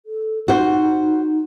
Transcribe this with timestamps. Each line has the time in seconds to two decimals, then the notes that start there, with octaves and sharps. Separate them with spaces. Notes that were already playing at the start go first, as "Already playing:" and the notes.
0.06 A4
0.48 D#4 F#4 C5